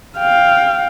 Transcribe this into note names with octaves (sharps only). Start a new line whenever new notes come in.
F5 G5